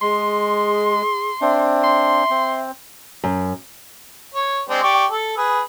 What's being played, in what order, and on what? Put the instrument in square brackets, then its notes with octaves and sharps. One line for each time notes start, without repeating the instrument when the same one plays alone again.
[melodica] G#3 [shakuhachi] G#4 [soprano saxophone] C6
[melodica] C4 D4 [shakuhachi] E5
[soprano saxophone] C6
[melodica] C4
[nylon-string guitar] F#2
[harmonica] C#5
G#3 C4 D4
G4 D5 C#6
A4
G#4 B4